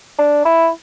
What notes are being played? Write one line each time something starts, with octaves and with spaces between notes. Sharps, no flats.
D4
E4